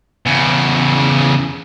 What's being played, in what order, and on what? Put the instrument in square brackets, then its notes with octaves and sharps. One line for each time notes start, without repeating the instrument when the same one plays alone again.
[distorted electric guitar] E2 C#3